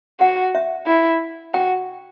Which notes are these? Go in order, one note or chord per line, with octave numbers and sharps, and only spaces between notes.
F#4 F#5
E5
E4
F#4 G5